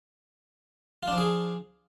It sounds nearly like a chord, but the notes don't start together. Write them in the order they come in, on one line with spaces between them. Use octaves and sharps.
F4 D4 F3 G#4